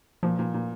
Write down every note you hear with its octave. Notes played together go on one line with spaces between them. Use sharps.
A#2 F3
A#2
A#2